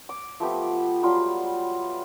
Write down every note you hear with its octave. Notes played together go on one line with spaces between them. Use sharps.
D6
F3 A3 B3 G4
F#3 G3 F4